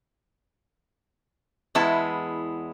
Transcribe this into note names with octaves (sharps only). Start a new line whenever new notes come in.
E2 G#3 B3 E4 A5